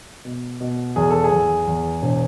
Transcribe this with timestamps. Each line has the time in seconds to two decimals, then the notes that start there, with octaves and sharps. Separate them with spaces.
0.25 B2
0.60 B2
0.96 E2 G#4
1.10 A4
1.24 G#4
1.32 E2
1.67 E2
2.02 E1